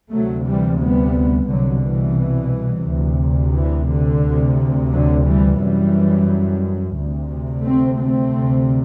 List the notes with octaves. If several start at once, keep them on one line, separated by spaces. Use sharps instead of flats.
D2 C3 F#3 A3
E3 G3
G3 B3
C2 B2 D3 F#3
E3
D2 C3
E3
D3
D2 C3
D3 F#3
E3 G3
F#2 E3 G3
D2 C3
A3 C4
A3 C4
D2 C3